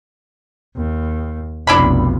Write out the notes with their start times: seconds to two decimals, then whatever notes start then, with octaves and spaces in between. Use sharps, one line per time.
0.76 D#2
1.67 F1 B1 D4 E4 B5